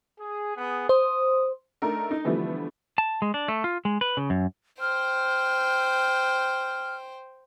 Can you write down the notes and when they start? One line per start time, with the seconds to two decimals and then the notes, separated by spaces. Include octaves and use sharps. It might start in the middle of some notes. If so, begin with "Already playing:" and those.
0.20 G#4
0.56 B3 G#4
0.89 C5 D#6
1.82 A3 D4 D#4 A4 A#4
2.11 D#4
2.24 D3 E3 F3 G3 A3 B3
2.98 A5
3.22 G#3
3.34 D4
3.48 A3
3.64 F4
3.85 G#3
4.01 B4
4.17 C#3
4.30 F#2
4.80 C5 G5 F6